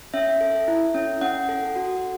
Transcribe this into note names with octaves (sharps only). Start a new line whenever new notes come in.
C#4 E5
A4
E4
C#4
C#4 F#5
A4
F#4